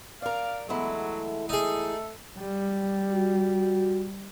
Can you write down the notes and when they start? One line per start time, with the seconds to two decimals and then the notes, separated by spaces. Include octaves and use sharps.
0.22 A#4 D5 F5
0.69 E2 F#3 G#3 A3 E4
1.49 A3 D#4 G#4 A4
2.38 G3
3.12 F#4